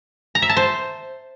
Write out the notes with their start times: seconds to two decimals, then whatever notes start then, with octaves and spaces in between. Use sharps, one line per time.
0.35 A#5
0.42 E5
0.49 A5
0.57 C5